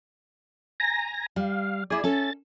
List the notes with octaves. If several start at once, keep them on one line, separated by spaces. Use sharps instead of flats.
G#5 A#5 A#6
G3 F5
E4 G#4 D5 G#5
C#4 A4 A6